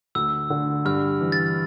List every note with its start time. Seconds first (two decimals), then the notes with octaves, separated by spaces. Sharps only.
0.15 D2 E6
0.50 D3
0.85 G2 F6
1.21 E3
1.32 A6